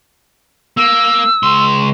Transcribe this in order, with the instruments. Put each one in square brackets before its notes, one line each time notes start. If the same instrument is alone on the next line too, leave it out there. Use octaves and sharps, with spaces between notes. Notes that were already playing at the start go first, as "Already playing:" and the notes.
[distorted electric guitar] A#3 [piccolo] E6
[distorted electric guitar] C#2 C6